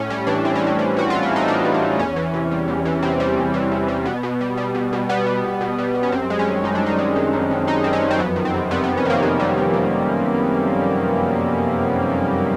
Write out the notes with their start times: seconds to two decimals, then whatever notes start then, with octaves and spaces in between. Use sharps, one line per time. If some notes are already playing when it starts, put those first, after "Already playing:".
Already playing: A2 C#4
0.10 G3 C#4
0.27 E3 D4
0.44 A2 C4
0.55 C#4
0.61 A2
0.67 C4
0.79 G3
0.97 E3 F#4
1.10 A2 F4
1.23 E4
1.31 A2 D#4
1.48 G3 D4
1.65 E3
1.74 D4
1.82 A2
1.99 E2 C#4
2.16 E3
2.34 C3
2.51 G3
2.68 E2
2.85 E3
3.02 C3 C4
3.20 G3
3.37 E2
3.54 E3
3.72 C3
3.88 G3
4.05 B2 B3
4.23 B2
4.41 G3
4.57 G3
4.75 B2
4.93 B2
5.09 G3 B3
5.26 G3
5.44 B2
5.61 B2
5.78 G3
5.95 G3
6.03 C#4
6.12 F#2 C4
6.30 G#3
6.39 C#4
6.48 D#3
6.64 F#2 D#4
6.75 D4
6.82 F#2 D#4
6.98 G#3
7.16 D#3
7.33 F#2
7.51 F#2
7.67 G#3 D#4
7.84 D#3 C4
7.93 C#4
8.02 F#2
8.11 C4
8.19 F2 B3
8.36 D#3
8.45 C4
8.54 C3
8.71 G3 B3
8.84 F2 B3
8.97 C#4
9.05 D#3 A#3
9.22 C3 B3
9.40 G3
9.58 F2
9.74 D#3